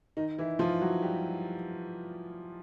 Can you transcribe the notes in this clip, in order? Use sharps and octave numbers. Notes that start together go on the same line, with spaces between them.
D#3 D#4
E3 E4
F3 F4
F#3 F#4
G3 G4